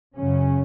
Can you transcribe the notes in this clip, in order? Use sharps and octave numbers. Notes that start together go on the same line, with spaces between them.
F#2 C#3 C#4